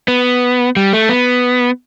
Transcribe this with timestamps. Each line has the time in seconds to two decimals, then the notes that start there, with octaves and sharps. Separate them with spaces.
0.08 B3
0.76 G3
0.93 A3
1.09 B3